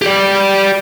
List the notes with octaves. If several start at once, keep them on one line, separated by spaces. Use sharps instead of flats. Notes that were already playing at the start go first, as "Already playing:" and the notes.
G4 D5